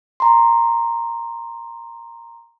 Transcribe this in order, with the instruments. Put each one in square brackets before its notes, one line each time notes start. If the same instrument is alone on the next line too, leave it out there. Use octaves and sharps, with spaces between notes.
[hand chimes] A#5 C6